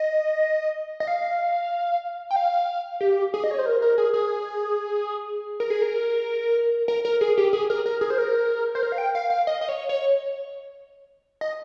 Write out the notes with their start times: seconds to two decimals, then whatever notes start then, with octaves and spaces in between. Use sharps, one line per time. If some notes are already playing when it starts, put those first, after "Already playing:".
Already playing: D#5
1.00 D#5
1.07 F5
2.31 G5
2.36 F5
3.01 G4
3.34 G#4
3.44 D#5
3.51 C#5
3.59 C5
3.66 A#4
3.82 A#4
3.98 G#4
4.14 G#4
5.60 A#4
5.70 G#4
5.82 A#4
6.88 A#4
7.05 A#4
7.21 G#4
7.38 G4
7.53 G#4
7.70 A#4
7.86 A#4
8.01 G#4
8.10 C5
8.18 A#4
8.75 C5
8.83 A#4
8.92 F5
8.98 G5
9.15 F5
9.30 F5
9.47 D#5
9.61 D#5
9.69 C#5
9.89 C#5
11.41 D#5